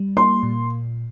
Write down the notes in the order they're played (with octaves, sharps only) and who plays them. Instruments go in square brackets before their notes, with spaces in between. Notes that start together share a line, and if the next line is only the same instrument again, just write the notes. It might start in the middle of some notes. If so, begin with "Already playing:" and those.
Already playing: [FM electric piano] G3
[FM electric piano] A#3 [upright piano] C6
[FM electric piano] A#2